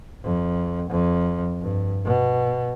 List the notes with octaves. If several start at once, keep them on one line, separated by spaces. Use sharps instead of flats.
F2
F2
G2
B2